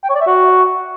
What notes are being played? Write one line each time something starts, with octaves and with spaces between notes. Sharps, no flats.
G5
C#5
D5
E5
F#4